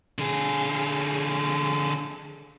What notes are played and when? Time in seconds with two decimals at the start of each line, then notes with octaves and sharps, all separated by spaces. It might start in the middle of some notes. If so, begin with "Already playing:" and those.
0.18 D3 G#4